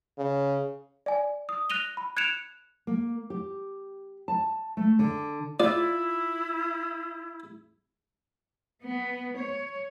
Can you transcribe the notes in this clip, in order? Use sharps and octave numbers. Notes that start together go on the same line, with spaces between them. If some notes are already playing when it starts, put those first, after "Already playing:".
C#3
D5 G#5
D#6
F#6 A#6 D#7 F7 G7
B5
F#6 G#6 C#7 D7 E7 F7
A#3
G4
A5
A3
D3
E4 F4 D5
B3
C#5